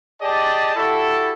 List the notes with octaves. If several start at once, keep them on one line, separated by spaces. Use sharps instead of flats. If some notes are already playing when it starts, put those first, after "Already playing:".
G4 G#4 D5 D#5 A5
E4 F#4 G4 A4